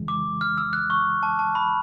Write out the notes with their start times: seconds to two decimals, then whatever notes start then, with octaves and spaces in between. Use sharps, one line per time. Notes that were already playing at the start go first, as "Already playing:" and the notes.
Already playing: F2 C#3 E3 G#3
0.08 D6
0.41 F6
0.57 E6
0.73 F#6
0.90 C#6
1.23 A5
1.39 A5
1.55 B5